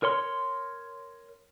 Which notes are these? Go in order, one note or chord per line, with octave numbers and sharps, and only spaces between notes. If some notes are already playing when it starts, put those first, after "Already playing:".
A#4 C#5 C6